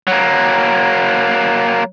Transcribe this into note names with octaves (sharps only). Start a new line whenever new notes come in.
F#3 A#3